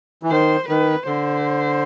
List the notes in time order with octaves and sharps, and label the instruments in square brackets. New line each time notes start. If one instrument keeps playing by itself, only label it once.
[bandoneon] E3
[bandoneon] D#3 [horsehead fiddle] C5
[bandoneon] D#3 [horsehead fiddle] B4
[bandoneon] D3 [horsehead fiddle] C5